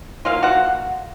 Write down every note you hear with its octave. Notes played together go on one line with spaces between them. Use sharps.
F#3 A#3 D#4 F4 F5
F#4 F#5